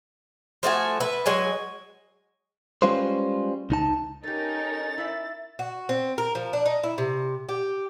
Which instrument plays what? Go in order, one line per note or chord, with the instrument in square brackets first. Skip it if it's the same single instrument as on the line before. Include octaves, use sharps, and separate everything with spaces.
[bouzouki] F3 A3 F#4 G#5
B4 E5
F#3 G#3 G#5
[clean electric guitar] G3 G#3 C#4 F4 B4 C5
C#2 D#4 A5
[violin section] C#4 D#4 A#4 [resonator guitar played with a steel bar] G4 A4 [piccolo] A6
[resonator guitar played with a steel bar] E4 E5
[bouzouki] F#4
C4
A#4
F3
D4
D#4
E4
C3
G4